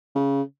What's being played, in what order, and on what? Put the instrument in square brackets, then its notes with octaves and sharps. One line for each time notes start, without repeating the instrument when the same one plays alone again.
[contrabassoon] C#3